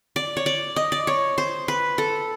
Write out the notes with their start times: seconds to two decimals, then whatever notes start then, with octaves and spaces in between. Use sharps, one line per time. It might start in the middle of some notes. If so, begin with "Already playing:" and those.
0.16 D5
0.37 C#5
0.46 D5
0.76 D#5
0.92 D5
1.07 C#5
1.38 C5
1.68 B4
1.98 A4